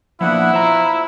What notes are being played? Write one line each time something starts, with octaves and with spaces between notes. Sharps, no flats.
F3 A#3 B3 D4 E4 F#5
F4 C5 A#5